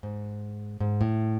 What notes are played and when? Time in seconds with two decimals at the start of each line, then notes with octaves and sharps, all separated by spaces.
0.03 G#2
0.80 G#2
1.01 A2